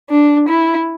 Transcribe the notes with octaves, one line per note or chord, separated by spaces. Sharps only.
D4
E4